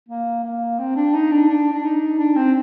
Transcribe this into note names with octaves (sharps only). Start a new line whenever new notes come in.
A#3
A#3
C4
D4
D#4
D4
D4
D4
D#4
D4
C4